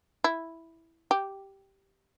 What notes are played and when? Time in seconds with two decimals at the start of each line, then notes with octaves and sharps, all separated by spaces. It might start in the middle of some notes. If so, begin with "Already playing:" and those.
0.24 E4
1.11 G4